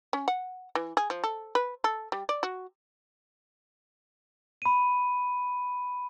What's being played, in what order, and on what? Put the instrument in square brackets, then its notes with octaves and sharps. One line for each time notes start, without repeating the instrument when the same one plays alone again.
[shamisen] C#4
F#5
E3
G#4
F3
A4
B4
A4
G3
D5
F#4
[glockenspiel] B5 D#7